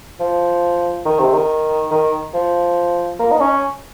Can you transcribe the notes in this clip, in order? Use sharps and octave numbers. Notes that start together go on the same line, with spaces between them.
F3
D#3
C3
D#3
D#3
F3
A#3
D#4
C#4